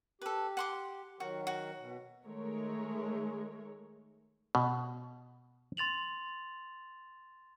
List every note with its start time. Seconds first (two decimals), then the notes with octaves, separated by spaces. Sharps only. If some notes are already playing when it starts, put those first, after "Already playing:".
0.22 G4 A4 B4
0.57 F#5 C6 D6
1.20 D#3 F#3 F#4 A#4
1.47 F#4
1.78 B2
2.26 D#3 G#3 A3 A#4 C#5
4.55 B2
5.77 C6 A6 F7 F#7